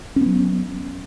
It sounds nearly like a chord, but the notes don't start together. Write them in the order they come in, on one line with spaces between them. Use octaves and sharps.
C#4 B3 F#3